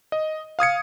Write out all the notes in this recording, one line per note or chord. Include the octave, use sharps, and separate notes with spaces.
D#5
F5 D#6 G#6 C#7